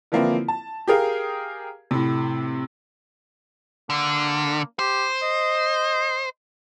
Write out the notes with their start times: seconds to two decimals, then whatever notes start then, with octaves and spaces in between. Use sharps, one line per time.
0.12 D3 E3 F3 A#3 C4 E4
0.48 A5
0.88 G4 G#4 A#4 F5
1.91 A2 C3
3.90 D3 A#3
4.79 G4 C5
5.22 D#5